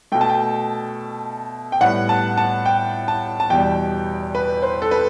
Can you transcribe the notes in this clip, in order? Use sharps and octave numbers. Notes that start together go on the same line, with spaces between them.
B2 A3 G5
A5
G5
G5
A2 G3 B3 F#5
A5
A5
G5
A5
A5
E2 B2 G3 G5
B4
C5
A4
B4